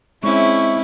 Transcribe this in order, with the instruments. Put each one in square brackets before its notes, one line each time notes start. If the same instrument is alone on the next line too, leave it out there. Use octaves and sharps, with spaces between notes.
[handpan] G#3 E5 [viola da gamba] C4 C#4 [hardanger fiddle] E4 [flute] C#6